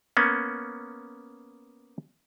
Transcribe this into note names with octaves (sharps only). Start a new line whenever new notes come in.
A#3 B3 C#4